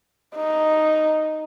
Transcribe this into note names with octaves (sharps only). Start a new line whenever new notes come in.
D#4